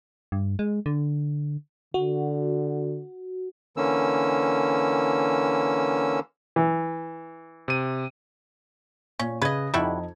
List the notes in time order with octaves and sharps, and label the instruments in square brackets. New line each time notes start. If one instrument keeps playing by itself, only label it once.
[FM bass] G2
G#3
D3
[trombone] D3 [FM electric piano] F#4
[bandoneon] D3 E3 A#3 C#4 E6
[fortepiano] E3
[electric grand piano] C3 D#7
[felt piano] A#2 [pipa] C#4
[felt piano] C#3 G#6 [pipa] B4 D#5
[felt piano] F2 D#4 [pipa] G3 E4 F#4